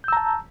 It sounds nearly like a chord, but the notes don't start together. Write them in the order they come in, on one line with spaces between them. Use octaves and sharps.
G6 E6 A#5 A5